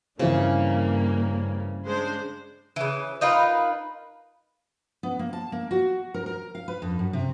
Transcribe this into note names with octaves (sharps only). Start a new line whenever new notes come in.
G2 C#3 E3 A#3 C4
G#3 D4 C5
C#3 E3
D#4 F4 A#4 B4
B3
A#3
A5
A#3
F#4
A#4
A#4
F5
B4
F2
F#2
C3